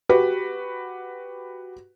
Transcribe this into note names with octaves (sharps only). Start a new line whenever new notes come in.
F#4 G4 B4